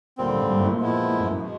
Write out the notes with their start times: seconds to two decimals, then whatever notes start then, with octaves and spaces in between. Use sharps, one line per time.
0.18 D#2 A#2 D3 G3 C4
0.34 G#2
0.49 G2
0.59 F#2
0.65 A2
0.69 A#2
0.79 F3 G#3 B3 E4
1.10 A2
1.20 F#2
1.30 F#2
1.40 B2 G#3